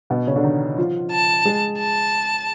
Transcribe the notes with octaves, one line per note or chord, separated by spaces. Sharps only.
B2 B3
C#3 C#4
D3 D4
D#3 D#4
F3 F4
A5
G#3 G#4
A5